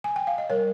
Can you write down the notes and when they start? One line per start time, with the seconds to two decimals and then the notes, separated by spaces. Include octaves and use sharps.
0.04 G#5
0.16 G5
0.27 F5
0.38 D#5
0.50 G3 A#4 C#5